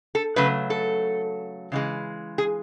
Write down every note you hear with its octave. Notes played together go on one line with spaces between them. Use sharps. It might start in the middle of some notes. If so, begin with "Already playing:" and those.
A4
C#3 F#3 A3 B4
A4
C#3 E3 G#3
G#4